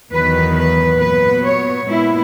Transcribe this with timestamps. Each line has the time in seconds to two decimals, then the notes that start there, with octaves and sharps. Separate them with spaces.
0.11 E2 D#3 F#3 B3 B4
0.56 B4
1.00 A#2 F#3 B3 B4
1.43 C#5
1.88 A#2 G#3 B3 E4